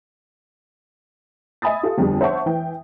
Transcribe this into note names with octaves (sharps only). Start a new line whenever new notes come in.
D#5 E5 G#5 B5 D#6 A6
F4 G4 A4
G1 F2 G3 G#4
C5 C#5 E5 F#5 A5 C#6
E3 G5